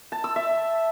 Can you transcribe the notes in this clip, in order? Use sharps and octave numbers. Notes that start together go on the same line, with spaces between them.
A5
E6
E5